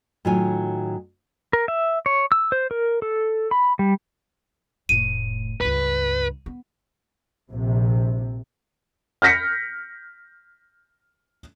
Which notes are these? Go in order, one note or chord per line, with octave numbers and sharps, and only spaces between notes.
A2 D#3 F#3 F4 G#5
A#4
E5
C#5
E6
C5
A#4
A4
B5
G3
F1 A2 D#7
C#2 G2 B4
B3
A#1 C3
F6 G6 A#6 B6 C#7